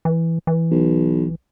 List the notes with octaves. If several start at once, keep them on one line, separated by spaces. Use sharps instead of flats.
E3
E3
B1